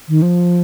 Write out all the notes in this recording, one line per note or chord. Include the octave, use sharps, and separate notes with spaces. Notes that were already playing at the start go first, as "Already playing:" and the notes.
D#3
F3